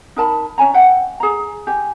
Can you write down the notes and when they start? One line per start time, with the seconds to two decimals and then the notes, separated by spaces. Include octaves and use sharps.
0.16 D#4 A#4 A5 B5
0.58 C#4 C#5 G#5 A#5
0.74 E5 F#5 G5
1.20 G#4 A#5
1.67 G4 G#5